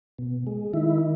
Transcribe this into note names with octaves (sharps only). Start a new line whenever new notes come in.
B2
G#3
D#3 E4